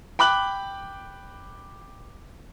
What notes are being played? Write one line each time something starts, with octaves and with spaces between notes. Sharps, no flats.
G5 B5 D6 F#6 F#7